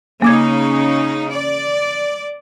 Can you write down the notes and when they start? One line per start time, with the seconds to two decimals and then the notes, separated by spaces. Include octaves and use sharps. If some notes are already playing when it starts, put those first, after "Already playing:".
0.22 C#3 A#3 C#4 D#4 D6 G#6
1.31 D5